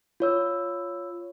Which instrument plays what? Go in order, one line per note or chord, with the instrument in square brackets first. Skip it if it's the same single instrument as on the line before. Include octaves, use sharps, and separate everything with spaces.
[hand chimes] F4 C#5 E6